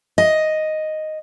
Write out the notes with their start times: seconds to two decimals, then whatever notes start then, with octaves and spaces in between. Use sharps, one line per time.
0.18 D#5